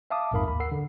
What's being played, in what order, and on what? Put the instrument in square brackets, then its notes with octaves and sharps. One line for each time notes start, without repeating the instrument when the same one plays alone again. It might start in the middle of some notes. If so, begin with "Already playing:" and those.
[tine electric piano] E5 F5 A5 D6 D#6
A#1 F2 G#2 A#4 F5 B5
D#2 B5
A#4 F#5 E6 C7
D3